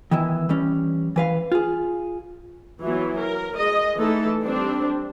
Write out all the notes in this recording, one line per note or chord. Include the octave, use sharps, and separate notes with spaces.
D#3 E3 B3 E4
E3 G3 C#4
E3 B4 F5
F4 G#4
E3 F#3 B3
A#4
G#3 D#5
E3 A3 D#4 A4
G3 C4 D4